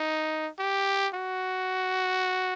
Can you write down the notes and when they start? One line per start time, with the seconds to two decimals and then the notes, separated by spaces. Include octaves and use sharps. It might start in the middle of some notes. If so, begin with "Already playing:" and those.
Already playing: D#4
0.59 G4
1.14 F#4